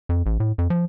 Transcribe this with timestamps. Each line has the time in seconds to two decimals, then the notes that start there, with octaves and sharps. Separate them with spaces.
0.09 F2
0.26 A1
0.40 A2
0.58 F2
0.70 F3